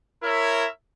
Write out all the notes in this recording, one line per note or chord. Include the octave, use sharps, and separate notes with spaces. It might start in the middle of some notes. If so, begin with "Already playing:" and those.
E4 A#4 C#5 E5